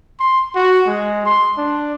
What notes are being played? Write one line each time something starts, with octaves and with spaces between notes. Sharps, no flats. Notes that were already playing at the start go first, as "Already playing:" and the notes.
C6
F#4
G#3
C6
D4